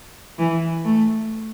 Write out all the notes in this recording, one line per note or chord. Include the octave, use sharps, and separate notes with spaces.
E3
A3